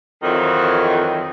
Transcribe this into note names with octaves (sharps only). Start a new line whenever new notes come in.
F2 D#3 E3 F#3